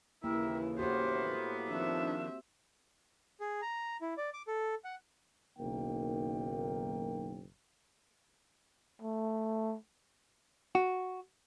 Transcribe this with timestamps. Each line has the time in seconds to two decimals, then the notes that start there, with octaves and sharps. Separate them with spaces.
0.24 D#2 C#3 E3 A#3 E4 G4 A#4 E5
0.79 A2 A#3 B3 F#4 G4 C5
1.69 D#3 F3 C4 D4 E5
3.40 G#4
3.62 A#5
4.01 E4
4.17 D5
4.33 D6
4.48 A4
4.84 F#5
5.59 F#1 B1 D#3 A#3 G5
9.01 A3
10.75 F#4